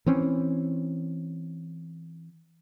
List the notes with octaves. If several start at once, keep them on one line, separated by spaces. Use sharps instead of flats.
E3 C4 C#4